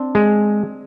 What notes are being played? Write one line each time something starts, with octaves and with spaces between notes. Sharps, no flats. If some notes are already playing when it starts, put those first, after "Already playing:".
Already playing: C4 D4
G#3